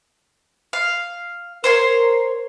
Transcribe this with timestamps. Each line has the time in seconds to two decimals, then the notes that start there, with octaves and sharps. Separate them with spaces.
0.73 F5
1.64 A#4 C5 C#5 C6